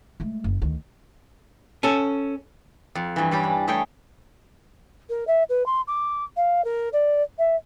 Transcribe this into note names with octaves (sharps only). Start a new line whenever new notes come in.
G#3 A3
F#1
D2 D#3
C#4 A4
F2
G2 E3
E3 G3 C#4 G4
D4
G3 A3 G#4 C#5 G5
A#4
E5
B4
C6
D6
F5
A#4
D5
E5